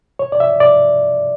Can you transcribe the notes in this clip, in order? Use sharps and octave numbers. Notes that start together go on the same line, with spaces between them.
C#5
D5
E5
D5